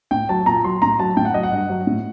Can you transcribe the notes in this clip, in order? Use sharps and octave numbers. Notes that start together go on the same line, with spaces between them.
A2 G5
F#3 A5
A#2 A#5
F#3 C6
A2 A#5
F#3 A5
A2 G5
F#5
F#3 D#5
F#5
G2
F#3
A2